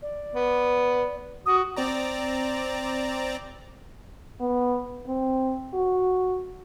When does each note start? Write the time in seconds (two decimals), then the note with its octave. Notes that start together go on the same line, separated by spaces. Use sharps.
0.02 D5
0.35 B3
1.46 F#4 D#6
1.77 C4 D5 A#5
4.40 B3
5.08 C4
5.74 F#4